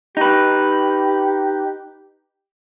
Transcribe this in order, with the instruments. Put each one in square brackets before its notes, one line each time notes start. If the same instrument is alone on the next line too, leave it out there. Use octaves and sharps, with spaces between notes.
[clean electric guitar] D#4 B4 [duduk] G4